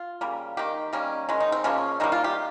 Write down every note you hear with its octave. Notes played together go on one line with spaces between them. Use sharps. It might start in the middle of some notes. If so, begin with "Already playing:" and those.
Already playing: F4
C#3 G3 A#3
D#3 A#3 G4
D#3 G3 A#3 C#4
D#3 G#3 C#4
D#4
C4
C#3 F3 A#3 C#4
D#3 G3 A#3 D#4
F4
G4